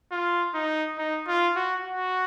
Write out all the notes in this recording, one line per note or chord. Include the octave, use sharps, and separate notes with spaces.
F4
D#4
D#4
F4
F#4
F#4